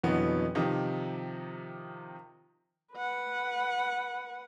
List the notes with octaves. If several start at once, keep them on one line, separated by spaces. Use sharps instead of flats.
F2 B2 D3 E3 F#3 B3
C3 D#3 F3 D#4 G4
B4 F#5